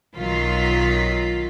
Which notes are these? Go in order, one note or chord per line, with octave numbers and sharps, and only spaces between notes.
B1 D#3 F#3 F4 B6